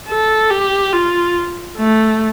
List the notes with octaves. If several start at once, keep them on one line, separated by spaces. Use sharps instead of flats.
A4
G4
F4
A3